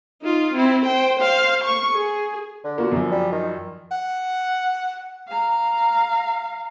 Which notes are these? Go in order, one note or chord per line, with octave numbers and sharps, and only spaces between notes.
D#4 F4
C4 E4
C5 G5
C5 F5
C#6
G#4
D3
A#3 F4 F#4
F#2 F3
G3
D#3
F#5
F5 A#5